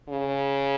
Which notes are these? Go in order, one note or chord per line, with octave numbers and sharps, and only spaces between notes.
C#3